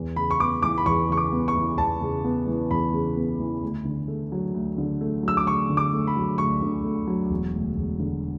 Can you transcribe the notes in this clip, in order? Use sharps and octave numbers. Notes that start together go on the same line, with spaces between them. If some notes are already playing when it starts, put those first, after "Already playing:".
Already playing: E2
C#3 B5
C#6
B3 D6
E3 D6
B5
E2 C#6
C#3 C#6
D6
B3
C#6
E3
E2 A5
C#3
B3
E3
E2 B5
C#3
B3
E3
D2
D3
A3
F#3
D2
D3
A3
F#3 E6
D6
D2 C#6
D3
D6
A3
B5
F#3
D2 C#6
D3
A3
F#3
E1
D2
E1
D3